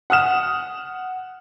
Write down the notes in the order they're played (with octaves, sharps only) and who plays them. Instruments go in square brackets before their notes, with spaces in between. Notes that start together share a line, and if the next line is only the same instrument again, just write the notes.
[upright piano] F#5 D#6 F6 E7